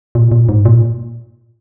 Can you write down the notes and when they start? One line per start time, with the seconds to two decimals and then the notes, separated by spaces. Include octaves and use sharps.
0.15 A#2
0.32 A#2
0.49 G#2
0.65 A#2